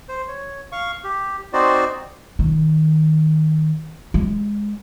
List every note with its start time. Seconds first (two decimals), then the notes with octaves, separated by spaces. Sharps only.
0.09 C5
0.28 C#5
0.72 F5 C#6
1.04 G4
1.53 C4 D#4 F#4 C5 D5
2.39 D#3
4.14 G#3